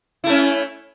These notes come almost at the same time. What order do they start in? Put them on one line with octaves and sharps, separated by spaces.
E4 A3 C#4